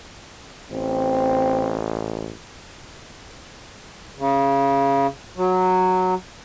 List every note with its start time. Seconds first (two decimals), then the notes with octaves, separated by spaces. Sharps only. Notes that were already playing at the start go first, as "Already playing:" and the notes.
0.72 A1 C4
4.18 C#3
5.37 F#3